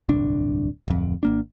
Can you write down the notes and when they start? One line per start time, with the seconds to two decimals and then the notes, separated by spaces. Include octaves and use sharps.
0.09 D1 G1 C2 D4
0.88 D1 F2
1.23 G#1 A#3 D4